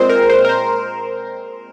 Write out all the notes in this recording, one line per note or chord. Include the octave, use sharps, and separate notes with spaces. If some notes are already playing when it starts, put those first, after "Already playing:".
Already playing: A#2 G#3 C4 C5
A#4
C5
A#4
C5